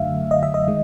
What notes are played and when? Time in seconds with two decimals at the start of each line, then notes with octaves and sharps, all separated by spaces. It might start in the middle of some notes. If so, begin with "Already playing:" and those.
Already playing: F#2 D3 F#3 A3 E5 F5
0.31 D#5
0.43 E5
0.54 D#5
0.68 D#3 G#3